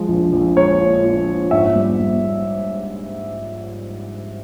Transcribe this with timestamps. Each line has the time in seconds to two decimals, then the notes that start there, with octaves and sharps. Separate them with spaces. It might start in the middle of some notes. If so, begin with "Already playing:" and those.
Already playing: F3 G#3
0.09 A#1
0.33 A#1
0.56 G#3 C#5
0.81 A#2
1.03 F3
1.27 F3
1.51 G#2 E5
1.75 G3
1.99 G3